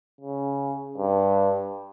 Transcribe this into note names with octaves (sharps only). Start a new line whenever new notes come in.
C#3
G2